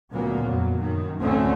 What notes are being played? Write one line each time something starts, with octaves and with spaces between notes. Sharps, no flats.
D2 A#2 C#3 F#3 A#3 B3
F2 F#3
F#2 D#3
D2 A2 D3 A3 C4 C#4